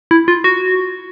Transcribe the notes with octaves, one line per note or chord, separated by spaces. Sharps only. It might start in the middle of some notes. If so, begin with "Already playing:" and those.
E4
F4
F#4